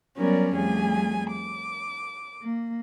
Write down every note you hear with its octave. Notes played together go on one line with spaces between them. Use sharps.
F#3 G3 B3 C#4 A#4 D5
F2 G3 A3 G#4 G#5
D6
A#3